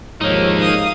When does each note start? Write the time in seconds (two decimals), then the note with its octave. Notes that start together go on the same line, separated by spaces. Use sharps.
0.21 D#2 G#2 F3 A#3 D#4 C#5
0.59 F5 D#6